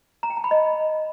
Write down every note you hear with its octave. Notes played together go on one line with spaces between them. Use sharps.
A#5
G5
A5
B5
D#5